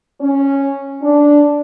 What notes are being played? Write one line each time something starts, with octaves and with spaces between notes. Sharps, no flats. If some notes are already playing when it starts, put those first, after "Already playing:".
C#4
D4